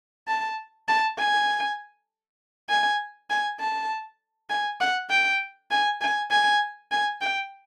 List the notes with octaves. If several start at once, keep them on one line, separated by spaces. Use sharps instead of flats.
A5
A5
G#5
G#5
G#5
A5
G#5
F#5
G5
G#5
G#5
G#5
G#5
G5